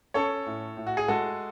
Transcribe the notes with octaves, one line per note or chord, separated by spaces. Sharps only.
C#4 A4 C#5
A2
A2
F#4
G#4
G#3 F#4 A4